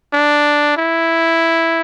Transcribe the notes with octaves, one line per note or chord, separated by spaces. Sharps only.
D4
E4